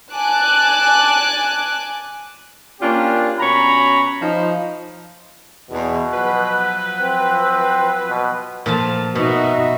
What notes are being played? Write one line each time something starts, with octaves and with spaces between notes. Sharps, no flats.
G#5 A5 D6 F#6
A#3 C#4 D4 F4 G4
B2 C#4 C#5 A#5 B5
F3 D#4
E2 B2
F3 F#3 B4
C4
B2
A#2 F3 A5
B2 D#4 F#4 E5